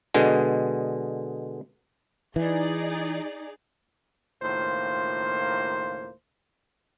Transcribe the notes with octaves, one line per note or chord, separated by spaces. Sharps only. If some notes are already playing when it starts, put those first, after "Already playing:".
B2 D3 G#3
E3 D#4 G#4 D5
C#2 A2 D#3 A#3 F4 C5